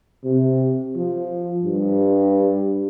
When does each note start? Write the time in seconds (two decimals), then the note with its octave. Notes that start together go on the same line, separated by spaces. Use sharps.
0.24 C3
0.96 F3
1.64 G2